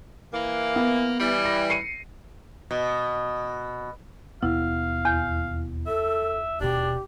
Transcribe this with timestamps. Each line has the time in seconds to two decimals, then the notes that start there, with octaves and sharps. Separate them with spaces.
0.33 E3 A#3
0.76 B3
1.19 E3 G3
1.45 A#6
1.70 C7 C#7 D#7
2.71 B2
4.43 D#2 B2 B3 E4 F5
5.05 E2 G6
5.87 A4 E5
6.61 D#1 B2 D4 G4